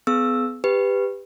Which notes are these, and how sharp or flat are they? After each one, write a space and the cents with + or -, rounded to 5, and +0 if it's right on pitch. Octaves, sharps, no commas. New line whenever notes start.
B3 +30 G#4 +30 E6 +0
G4 +20 B4 +10